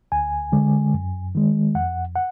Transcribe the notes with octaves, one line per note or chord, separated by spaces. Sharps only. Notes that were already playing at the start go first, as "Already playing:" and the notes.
D2 G#5
D3 G#3
F#2
D#3 G#3
F2 F#5
F#5